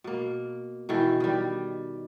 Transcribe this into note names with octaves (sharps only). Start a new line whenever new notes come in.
B2 A#3
B2 D#3 E3 A4
D#3 G3